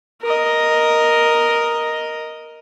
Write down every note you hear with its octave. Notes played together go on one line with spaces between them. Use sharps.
A#4 D#5